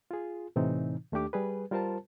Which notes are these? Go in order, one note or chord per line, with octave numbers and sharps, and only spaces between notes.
F4 G#4
A2 C3 E3 C4 D#4
D#2 A3 D4 G4 D6
G3 G#4 B4
G3 F4 A#4 C5 A5